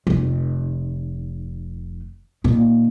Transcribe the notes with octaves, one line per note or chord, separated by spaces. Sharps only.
F1 D#3
A#2 D#3